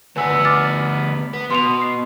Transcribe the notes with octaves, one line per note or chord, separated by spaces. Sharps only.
D2 B3 B4 G#5 E6
D6 F6 A6
B3
B2 C6 F7
C7